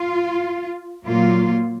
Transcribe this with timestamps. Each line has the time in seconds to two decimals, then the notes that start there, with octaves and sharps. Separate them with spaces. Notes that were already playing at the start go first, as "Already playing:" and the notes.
Already playing: F4
1.05 A#2 F#3 A#3 F4